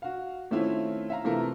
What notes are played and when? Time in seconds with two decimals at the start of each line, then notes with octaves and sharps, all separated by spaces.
0.02 F#4 F5
0.51 D#3 A3 C4 C#4 E4 F4
1.10 E5 F5 A#5
1.24 C3 E3 A3 F4 A4 A#4